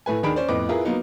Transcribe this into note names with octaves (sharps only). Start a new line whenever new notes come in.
A2 A3 B4 G#5
D#2 D#3 D4 G#4 B5 D7
C#4 C5 D5
F2 A2 B3 B4 D#5 D6
E4 F4 G#4 A#4 B4
F#3 A#3 B3 D#4